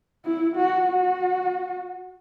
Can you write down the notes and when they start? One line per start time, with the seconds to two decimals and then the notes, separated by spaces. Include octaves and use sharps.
0.25 E4
0.56 F#4
0.87 F#4